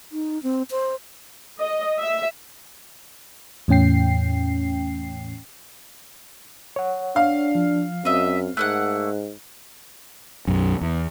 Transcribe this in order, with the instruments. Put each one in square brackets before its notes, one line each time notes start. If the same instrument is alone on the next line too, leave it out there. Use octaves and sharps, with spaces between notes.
[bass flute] D#4
C4
C5
[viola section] D#5
E5
[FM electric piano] E2 A2 C#4 G5 C7
[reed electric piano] C#5 F#5
[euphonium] D4 [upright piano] F5
[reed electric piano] F3
[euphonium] F#2 [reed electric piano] C4 [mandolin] D#5 E5
[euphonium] G#2 [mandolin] A3 A#3 F#5 [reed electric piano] F#6
[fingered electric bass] B1 F#2
E2